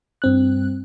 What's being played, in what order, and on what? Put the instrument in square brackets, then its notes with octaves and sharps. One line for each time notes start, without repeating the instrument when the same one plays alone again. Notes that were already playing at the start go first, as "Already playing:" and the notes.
[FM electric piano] G2 C4 F#6